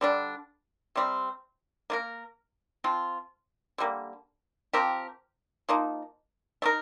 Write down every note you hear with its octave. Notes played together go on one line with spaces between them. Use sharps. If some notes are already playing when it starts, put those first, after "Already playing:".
D3 G3 D4
C3 G3 C4
A#3 F4 A#4
F3 C4 F4
D3 G3 A#3
F3 C4 G4 A#4
F3 A#3 D#4
A3 D#4 A#4